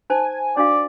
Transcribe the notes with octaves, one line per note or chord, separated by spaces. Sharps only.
D#4 C5 G#5 A5
D4 F#4 D5 F5